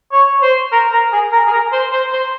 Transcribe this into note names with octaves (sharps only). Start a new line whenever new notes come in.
C#5
C5
A#4
A#4
G#4
A#4
G#4
A#4
C5
C5
C5